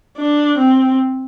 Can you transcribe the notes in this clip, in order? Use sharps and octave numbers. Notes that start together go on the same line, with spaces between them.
D4
C4